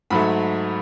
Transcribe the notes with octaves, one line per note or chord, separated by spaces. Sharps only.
G#2 F#3 A3 B5